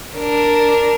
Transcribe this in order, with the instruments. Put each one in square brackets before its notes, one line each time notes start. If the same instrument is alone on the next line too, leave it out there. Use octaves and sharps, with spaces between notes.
[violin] D4 A#4